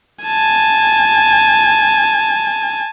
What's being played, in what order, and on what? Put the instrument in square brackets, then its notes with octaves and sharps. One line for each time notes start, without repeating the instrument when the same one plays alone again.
[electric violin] G#5 A5